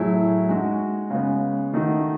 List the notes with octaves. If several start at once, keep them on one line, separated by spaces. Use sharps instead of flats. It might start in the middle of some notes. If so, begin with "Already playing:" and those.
Already playing: A2 F#3 A3 E4 G#4
G#3 D#4 F#4
C#3 G#3 B3
D#3 A3 D#4 F#4